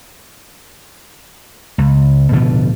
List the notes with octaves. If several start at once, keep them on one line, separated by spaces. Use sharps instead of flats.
C#2
D1 B2 D3 F3